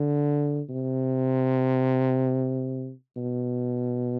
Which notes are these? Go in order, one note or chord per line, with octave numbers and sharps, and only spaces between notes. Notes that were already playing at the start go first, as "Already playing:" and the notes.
Already playing: D3
C3
B2